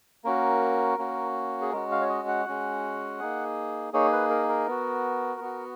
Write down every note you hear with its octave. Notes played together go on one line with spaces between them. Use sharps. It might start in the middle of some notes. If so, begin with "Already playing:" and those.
A#3 C#4 F#4 A#4
A#3 C#4 F#4
G#4
G#3 C#4 F#4 A#4
F5
C#5
D#5
F#5
G#3 C#4 F#4
A#3 D#4 G#4
A#3 D#4 G#4 C#5
B4
A#4
A#4
B3 F#4
B3 F#4